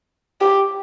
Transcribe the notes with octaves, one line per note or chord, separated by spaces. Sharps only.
G4